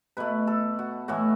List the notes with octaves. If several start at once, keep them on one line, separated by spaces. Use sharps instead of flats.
B2 A3 B4
A4
F#4
A2 E3 A3 F#4